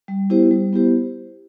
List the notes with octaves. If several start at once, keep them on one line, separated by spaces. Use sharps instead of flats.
G3
B3 E4 G4 C5
G3
B3 E4 G4 C5